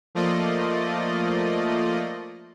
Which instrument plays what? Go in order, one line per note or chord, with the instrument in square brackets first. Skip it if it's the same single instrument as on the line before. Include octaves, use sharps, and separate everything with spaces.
[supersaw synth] F3 A3 A#3 F4 D5 D#5